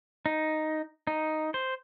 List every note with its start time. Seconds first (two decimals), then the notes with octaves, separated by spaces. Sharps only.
0.26 D#4
1.07 D#4
1.54 C5